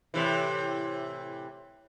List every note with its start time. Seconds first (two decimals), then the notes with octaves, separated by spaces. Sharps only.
0.14 A2 C3 E3